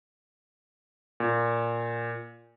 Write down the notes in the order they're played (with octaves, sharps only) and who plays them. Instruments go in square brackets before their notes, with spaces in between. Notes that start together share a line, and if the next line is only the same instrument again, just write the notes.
[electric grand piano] A#2